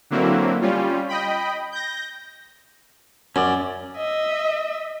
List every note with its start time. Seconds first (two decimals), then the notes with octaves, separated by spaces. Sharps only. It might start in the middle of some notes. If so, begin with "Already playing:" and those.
0.10 D3 F#3 A#3 C4 E4
0.61 G3 C#4 F4
1.09 D#5 G5 B5
1.72 G6 A#6
3.36 F#2 C#4 D5
3.97 D#5 E5